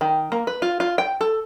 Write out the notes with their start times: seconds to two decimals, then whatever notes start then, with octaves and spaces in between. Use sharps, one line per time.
0.01 D#3
0.32 A#3
0.47 B4
0.62 F4
0.80 F4
0.98 G5
1.21 A4